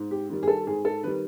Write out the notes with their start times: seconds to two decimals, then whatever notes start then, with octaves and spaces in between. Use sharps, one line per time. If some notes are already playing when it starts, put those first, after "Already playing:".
Already playing: G#2
0.11 G4
0.30 D#3 G3
0.43 G#4
0.48 A4
0.66 G#2 G#4
0.85 A4
1.03 D#3 G3 B4